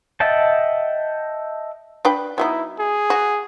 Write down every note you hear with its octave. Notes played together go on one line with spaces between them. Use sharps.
D#5 E5 F#5 G5 A5
D4 B4 G5
F#3 B3 D#4 E4
G#4
F#4